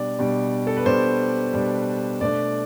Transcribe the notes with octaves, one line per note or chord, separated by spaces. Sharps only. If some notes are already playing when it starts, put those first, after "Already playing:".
Already playing: B2 G3 D4 D5
B2 G3 D4
A4
B4
B2 G3 D4 C5
B2 G3 D4
B2 A3 D4 D5